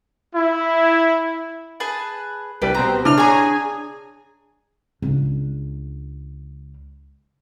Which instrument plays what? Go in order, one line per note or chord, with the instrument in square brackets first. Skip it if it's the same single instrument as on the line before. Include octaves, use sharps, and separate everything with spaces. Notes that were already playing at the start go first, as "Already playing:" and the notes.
[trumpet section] E4
[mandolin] G#4 B4 A5
[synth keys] C2 G3 [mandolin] D4 [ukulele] B4
[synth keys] B2 C4 G4 [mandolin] A#5
[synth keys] C#3 E4 F6 [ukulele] D4
[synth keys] G#4 G#5 D#6 [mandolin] C#5 A#5
[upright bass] C#2 D4